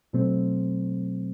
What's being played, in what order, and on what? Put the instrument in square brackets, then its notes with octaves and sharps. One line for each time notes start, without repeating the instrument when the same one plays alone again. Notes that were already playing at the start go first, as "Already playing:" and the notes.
[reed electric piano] B2 F#3 A3 C4